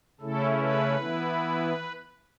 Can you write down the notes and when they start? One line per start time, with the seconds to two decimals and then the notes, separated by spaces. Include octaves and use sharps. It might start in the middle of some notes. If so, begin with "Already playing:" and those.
0.21 C#3 A3 C#4 E4 A4
0.59 B4
0.97 E3 B3 E4